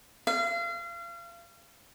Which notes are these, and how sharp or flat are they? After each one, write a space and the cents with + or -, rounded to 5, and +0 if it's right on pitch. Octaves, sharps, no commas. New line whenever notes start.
F5 -35